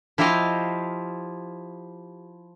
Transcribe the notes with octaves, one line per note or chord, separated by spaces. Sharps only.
F3 E4 F4 G4 D#5 F5